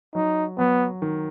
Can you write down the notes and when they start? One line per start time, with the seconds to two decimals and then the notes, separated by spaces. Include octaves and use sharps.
0.15 F#3 D#4
0.58 F#3 B3
1.02 D#3